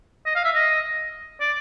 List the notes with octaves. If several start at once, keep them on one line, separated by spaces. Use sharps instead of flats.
D#5
F5
E5
D#5
D5